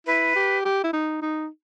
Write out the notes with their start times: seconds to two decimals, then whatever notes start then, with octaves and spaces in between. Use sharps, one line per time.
0.07 E4 B4
0.36 G4
0.65 G4
0.84 E4
0.93 D#4
1.22 D#4